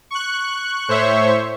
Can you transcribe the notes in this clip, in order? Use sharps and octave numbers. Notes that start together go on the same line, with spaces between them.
C#6 F#6
A2 C5 C#5 E5 C#6